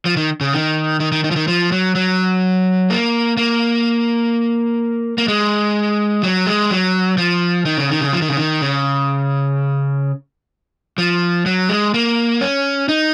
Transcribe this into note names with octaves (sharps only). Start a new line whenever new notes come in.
F3
D#3
C#3
D#3
D#3
D#3
D#3
F3
D#3
F3
F#3
F#3
A#3
A#3
A#3
G#3
F#3
G#3
F#3
F3
D#3
C#3
D#3
C#3
F3
D#3
C#3
D#3
C#3
F3
F#3
G#3
A#3
C#4
D#4